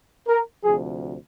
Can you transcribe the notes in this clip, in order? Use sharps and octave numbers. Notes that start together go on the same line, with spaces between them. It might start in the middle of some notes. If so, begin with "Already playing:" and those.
A#4
D2 C3 F3 G#4